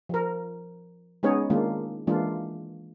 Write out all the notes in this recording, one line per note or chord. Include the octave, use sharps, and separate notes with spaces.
F3 A#4
G#3 B3 C#4 D#4 G#4 C#5
D#3 G#3 A#3 D4 F4
E3 G#3 A#3 D4 F4